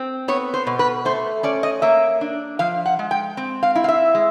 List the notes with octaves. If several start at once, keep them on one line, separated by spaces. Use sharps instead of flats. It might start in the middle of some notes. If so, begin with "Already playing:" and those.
Already playing: C4
B3 C#5
C5
B2
B4
A3 C5
C#4 D5
D#5
A#3 E5
D4
F3 F5
F#5
G#3
G5
C4
F5
E4
F5
E5
G#3